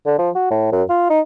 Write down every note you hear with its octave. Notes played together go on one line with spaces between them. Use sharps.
D3
F3
F#4
A2
F#2
F4
D#4